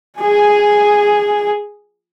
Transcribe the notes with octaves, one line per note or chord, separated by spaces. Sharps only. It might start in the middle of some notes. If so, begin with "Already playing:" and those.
G#4 G#5